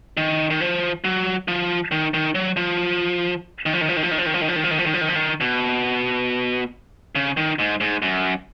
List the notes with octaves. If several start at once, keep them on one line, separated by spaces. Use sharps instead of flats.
D#3
D#3
F3
F#3
F3
D#3
D#3
F#3
F3
D#3
F3
D#3
F3
D#3
F3
D#3
F3
D#3
F3
D#3
F3
D#3
F3
D#3
F3
D#3
F3
D#3
F3
D#3
B2
C#3
D#3
G#2
G#2
F#2